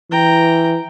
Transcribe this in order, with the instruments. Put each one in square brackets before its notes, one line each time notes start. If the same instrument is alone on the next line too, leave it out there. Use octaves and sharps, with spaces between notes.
[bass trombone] E3 [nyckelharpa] G5 A#5